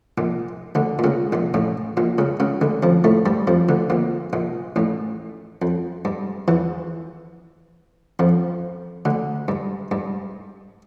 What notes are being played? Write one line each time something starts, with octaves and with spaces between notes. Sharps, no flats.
A#1 A#2
D2 D3
A#2
C#2 C#3
A#1 A#2
A1 A2
A#1 A#2
C#2 C#3
C#2 C#3
D2 D3
F2 F3
A2 A3
G2 G3
F2 F3
D2 D3
A#1 A#2
A#1 A#2
A1 A2
F2
G2
E2 E3
F2 F3
D2 D3
G2
G2